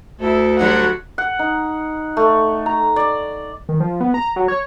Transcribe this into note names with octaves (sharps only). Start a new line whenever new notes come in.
D2 E4 A4
D3 F#3 G3 F#4 F#5
F#5
D#4
A3
A#5
D5
D#3
F3
B3
A#5
F#3
C#5